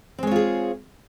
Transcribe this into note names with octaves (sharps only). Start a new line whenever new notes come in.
G#3 C4 F4 G#4 C#5